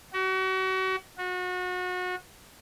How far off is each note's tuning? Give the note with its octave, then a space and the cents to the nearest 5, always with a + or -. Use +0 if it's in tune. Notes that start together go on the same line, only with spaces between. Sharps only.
F#4 +35
F#4 -30